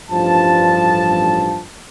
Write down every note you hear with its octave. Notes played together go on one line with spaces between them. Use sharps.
A1 G2 F3 A5